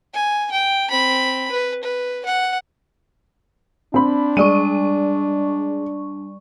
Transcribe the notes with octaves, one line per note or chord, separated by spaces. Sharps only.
G#5
G5
C4 B5
B4
B4
F#5
C4 D4 B5
G3 G#3 D5 C#6 D#7